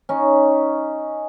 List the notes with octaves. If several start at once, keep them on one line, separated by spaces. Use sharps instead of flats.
C#4 D#4